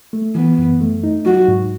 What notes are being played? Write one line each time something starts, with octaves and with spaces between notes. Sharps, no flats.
A3
E3 B3
F#2
A3
D#4
F#3 F#4
G#2